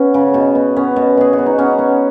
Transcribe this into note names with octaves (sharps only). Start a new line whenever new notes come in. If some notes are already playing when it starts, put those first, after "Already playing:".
Already playing: B3 C#4
C#3
B2
B3
B3 C#4
B2
B3 G#4
F#4
B3
D#4
B3 C#4
B3